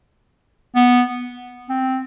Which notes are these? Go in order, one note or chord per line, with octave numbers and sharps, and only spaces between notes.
B3
C4